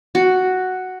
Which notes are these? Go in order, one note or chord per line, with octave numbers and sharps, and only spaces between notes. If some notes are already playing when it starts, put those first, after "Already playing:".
F#4